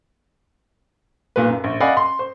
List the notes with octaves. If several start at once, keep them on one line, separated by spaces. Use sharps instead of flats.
B1 A#2 B4
F#2
A#1
D5 D#5 F5 F#5 G#5 B5
C6
C5